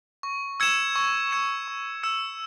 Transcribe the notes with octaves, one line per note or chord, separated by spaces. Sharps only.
C#6
E6 G#6 C#7 E7
C#6
E6 G#6 C#7 E7
C#6
E6 G#6 C#7 E7